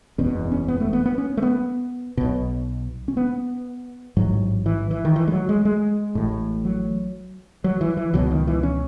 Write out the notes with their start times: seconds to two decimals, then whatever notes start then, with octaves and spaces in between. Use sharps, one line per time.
0.18 F#1 E2 B2 C#4
0.36 B3
0.52 C#4
0.68 B3
0.80 A3
0.93 B3
1.05 B3
1.18 C#4
1.37 A3
1.43 B3
2.17 B1 B2
3.08 C#4
3.17 B3
4.17 A1 G#2 F#3
4.66 E3
4.91 E3
5.05 D#3
5.16 E3
5.27 G#3
5.32 F#3
5.49 G#3
5.65 G#3
6.15 A1 A2
6.65 F#3
7.64 F#3
7.81 E3
7.97 E3
8.14 C#2 B2 F#3
8.31 D#3
8.47 E3
8.63 C#4